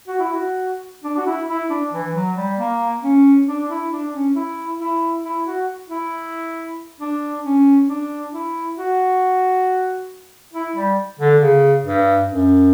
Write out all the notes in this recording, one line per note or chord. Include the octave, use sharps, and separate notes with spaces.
F#4
E4
F#4
D4
F#4
E4
E4
D4
E3
F#3
G3
A#3
C#4
D4
E4
D4
C#4
E4
E4
E4
F#4
E4
D4
C#4
D4
E4
F#4
E4
G3
D3
C#3
G2
F#2